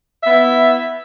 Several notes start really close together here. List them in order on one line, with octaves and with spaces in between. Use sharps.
E5 B3 E4